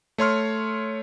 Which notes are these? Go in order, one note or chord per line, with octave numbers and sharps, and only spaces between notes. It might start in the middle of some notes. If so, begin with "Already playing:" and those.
A3 C#5 C6 F6